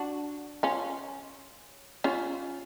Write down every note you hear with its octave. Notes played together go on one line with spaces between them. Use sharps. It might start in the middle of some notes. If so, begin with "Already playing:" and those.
Already playing: D4 F#4
C#4 F4
C#4 F4